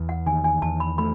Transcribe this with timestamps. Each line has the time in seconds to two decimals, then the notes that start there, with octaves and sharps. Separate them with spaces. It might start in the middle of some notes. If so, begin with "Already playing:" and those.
Already playing: E2
0.09 F#5
0.26 D#3 G#5
0.44 G#5
0.62 E2 A5
0.80 B5
0.98 A3 B5